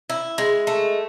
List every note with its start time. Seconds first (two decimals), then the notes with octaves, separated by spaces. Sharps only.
0.10 E4
0.38 G#3
0.67 A3